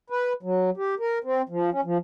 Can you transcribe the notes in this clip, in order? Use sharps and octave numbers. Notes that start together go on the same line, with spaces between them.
B4
F#3
G4
A#4
C4
F3
C#4
F3